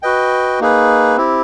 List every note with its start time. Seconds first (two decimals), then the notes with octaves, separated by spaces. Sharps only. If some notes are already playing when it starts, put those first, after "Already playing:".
0.02 F#4 B4 D#5 G5
0.60 A#3 D#4 G#4 B4
1.17 C4 E4 G4